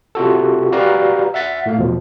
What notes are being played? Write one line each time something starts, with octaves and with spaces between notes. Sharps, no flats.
C3 F4 F#4 A4
F#4 G4 B4 D5 F5 A#5
E5 F#5 A6 B6
A2 A3 F5
E2 B2 F3